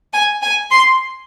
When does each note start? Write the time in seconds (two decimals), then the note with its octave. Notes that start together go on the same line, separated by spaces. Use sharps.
0.13 G#5
0.42 G#5
0.71 C6